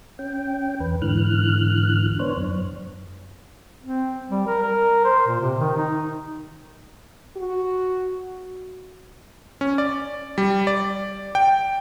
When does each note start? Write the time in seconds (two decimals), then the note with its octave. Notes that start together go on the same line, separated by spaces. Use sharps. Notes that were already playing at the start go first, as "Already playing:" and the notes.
0.19 C#4 G5
0.80 E2 B4
1.02 G#2 D3 E3 F6 F#6
2.19 B3 D4 C5 C#5
2.37 F#2
3.82 C4
4.30 G3
4.47 A#4
4.63 A#4
5.05 C5
5.27 A#2
5.40 C3
5.58 D#3
5.77 D#4
7.37 F#4
9.61 C#4
9.78 D5
10.38 G3
10.67 D5
11.35 G5